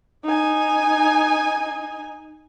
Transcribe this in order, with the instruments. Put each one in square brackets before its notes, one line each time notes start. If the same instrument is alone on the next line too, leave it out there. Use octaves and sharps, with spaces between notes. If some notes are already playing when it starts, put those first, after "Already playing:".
[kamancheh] D#4 G#5